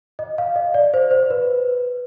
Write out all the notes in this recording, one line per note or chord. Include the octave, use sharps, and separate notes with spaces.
D#5
F5
D#5
D5
C5
C5
B4